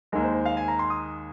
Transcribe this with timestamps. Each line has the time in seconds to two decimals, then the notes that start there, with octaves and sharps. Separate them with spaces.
0.12 D#2 D#3 G#3 A#4
0.23 C5
0.34 C5
0.45 F5
0.57 G#5
0.68 A#5
0.79 C6
0.90 D#6